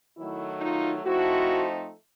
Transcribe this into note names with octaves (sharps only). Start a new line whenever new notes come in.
D#3 F#3 A3 E4
D#4 F4
F3 A3 C4 D#4 E4 F#4